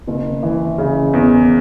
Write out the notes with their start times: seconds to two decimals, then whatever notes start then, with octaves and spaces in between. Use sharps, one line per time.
0.07 F#1
0.43 E3
0.78 C#3
1.13 E2